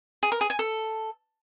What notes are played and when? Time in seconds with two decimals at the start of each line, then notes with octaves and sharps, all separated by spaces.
0.23 G#4
0.32 A#4
0.41 G#4
0.50 G#5
0.59 A4